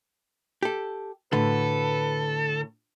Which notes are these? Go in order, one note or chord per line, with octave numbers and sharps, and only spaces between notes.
G4 A4
A2 D3 F#4 A4 B4